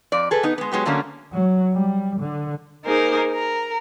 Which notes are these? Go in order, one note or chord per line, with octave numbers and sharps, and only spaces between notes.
F2 D5
G#4 A4 B4
B3 D#4
G#3 B3
F#3 G#3 B3 G4
D3 F#3 A3 A#3 C#4 D4
F#3
G3
D3
A#3 D#4 G#4 A#4 C5
A#4